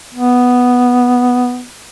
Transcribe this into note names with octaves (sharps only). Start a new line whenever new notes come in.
B3